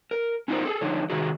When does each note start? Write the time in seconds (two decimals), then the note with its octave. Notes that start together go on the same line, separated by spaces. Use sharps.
0.11 A#4
0.48 C#4 D#4 F4 G4 A#4 C5
0.65 G#4 A4
0.81 D3 F3 D#4 C#5
1.10 C3 D#3 F#4 G#4